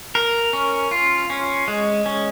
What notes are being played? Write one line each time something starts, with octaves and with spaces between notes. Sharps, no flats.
A#4
C#4
F4
C#4
G#3
C#4